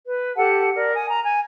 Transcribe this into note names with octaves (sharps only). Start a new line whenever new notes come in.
B4
G4 A4 F#5 A5
A#4 D5
G#5 D#6
A#5
G#5